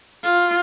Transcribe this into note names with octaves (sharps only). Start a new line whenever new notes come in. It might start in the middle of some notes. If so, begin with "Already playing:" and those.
F4